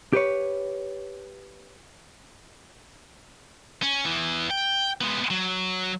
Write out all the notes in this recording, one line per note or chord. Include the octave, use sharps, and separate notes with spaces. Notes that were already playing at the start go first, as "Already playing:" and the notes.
G4 B4 C#5
C#4
E2 E3
G5
G#3 B3
F#3